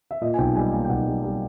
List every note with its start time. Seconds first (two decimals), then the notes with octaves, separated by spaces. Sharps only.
0.11 E5
0.21 A#2 D#5
0.34 G#5
0.38 B1 G5
0.55 G3 G#5
0.72 A#3 G#5
0.85 G5
0.89 B1 F#5
1.06 G3
1.23 G3